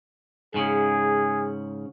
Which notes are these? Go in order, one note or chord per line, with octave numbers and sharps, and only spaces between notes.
G#2 C#3 G#4